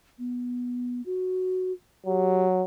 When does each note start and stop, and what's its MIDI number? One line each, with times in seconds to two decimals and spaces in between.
0.19 1.01 59
1.06 1.72 66
2.06 2.64 54
2.06 2.46 67